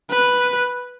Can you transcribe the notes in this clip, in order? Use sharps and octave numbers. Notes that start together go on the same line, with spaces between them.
B4